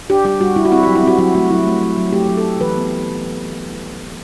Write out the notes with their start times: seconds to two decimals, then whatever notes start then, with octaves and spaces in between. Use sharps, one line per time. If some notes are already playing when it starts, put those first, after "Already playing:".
0.10 D4 G4
0.25 G3 G4
0.41 G3 F#4
0.56 G3 E4
0.65 F#4
0.72 C4 E4
0.83 G4
0.87 F#3
0.96 E4
1.03 C4 F#4
1.18 F#3 F#4
1.35 A3 F#4
1.51 F#3 E4
1.67 A3
1.81 F#3
1.97 F#3
2.13 A3 G4
2.29 F#3
2.37 A4
2.44 A3
2.61 E3 B4
2.76 B3